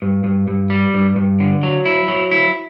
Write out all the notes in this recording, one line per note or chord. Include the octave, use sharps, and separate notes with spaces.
G2
G2
G2
G3
G2
G2
D3
F#3
E4
F#3
E4